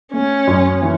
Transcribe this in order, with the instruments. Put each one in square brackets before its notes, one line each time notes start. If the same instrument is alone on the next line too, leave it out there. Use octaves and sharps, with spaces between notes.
[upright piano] A3 [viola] C#4
[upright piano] F#2
E3